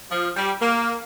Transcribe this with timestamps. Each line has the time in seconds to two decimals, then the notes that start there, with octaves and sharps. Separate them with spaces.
0.11 F3
0.36 G3
0.60 A#3